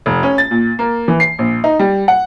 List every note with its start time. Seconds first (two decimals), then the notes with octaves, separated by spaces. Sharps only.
0.06 F1
0.23 C#4
0.38 A6
0.51 A#2
0.79 A#3
1.08 E3
1.20 C7
1.39 A#1
1.64 D#4
1.79 G3
2.08 F#5